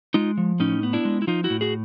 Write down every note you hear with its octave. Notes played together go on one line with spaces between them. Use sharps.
G#3 D#4 F4
F3
A2 C#4 D#4
B3
D4 E4
G#3
E4
F3 D#4 F4
E4 F#4
A2
F#4 G#4